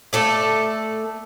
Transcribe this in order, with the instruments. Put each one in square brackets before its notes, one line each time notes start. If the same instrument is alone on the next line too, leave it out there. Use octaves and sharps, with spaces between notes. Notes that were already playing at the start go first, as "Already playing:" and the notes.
[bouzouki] A3 A4 D5